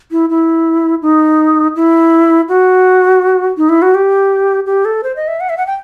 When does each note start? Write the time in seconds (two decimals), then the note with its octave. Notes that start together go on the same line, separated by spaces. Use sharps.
0.11 E4
0.30 E4
1.02 D#4
1.76 E4
2.49 F#4
3.57 D#4
3.69 E4
3.82 F#4
3.94 G4
4.66 G4
4.85 A4
5.03 C5
5.16 D#5
5.28 E5
5.40 F#5
5.49 E5
5.57 F#5
5.67 G5